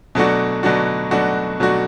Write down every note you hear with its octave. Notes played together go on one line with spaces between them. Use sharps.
B2 F#3 A3 D4 F#4
B2 F#3 A3 D4 F#4
B2 F#3 A3 D4 F#4
B2 F#3 A3 D4 F#4